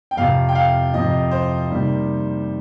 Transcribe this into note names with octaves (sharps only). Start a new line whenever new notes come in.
G5
F2 C3 F3 F5
G5
F5
F2 C3 F3 D#5
C5
C3 D#3 G3 A#3